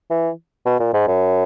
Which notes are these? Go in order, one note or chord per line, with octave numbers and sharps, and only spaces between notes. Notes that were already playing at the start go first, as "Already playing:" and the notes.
E3
B2
A#2
G#2
F#2